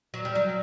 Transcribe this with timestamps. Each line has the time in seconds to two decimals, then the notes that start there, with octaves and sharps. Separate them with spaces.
0.14 F#3
0.25 G3
0.35 F#3